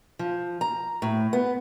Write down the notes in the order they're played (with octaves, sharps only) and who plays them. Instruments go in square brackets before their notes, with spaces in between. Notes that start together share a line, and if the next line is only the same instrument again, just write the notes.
[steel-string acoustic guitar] F3
A#5
A2
B3